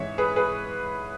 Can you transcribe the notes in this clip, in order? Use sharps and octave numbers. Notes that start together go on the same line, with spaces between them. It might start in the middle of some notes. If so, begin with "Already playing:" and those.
Already playing: G#2 E3 G#3 C#4 C#5 E5
G#4 B4
G#4 B4